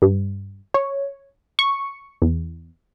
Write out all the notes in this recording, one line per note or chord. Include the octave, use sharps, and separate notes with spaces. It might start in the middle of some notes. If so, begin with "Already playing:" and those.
G2
C#5
C#6
E2